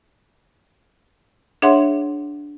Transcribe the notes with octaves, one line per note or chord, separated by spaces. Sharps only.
D4 G#4 C#5 E5 F#5 C6